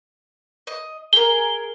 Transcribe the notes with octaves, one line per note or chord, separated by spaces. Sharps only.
D#5
G#4 A#4 G7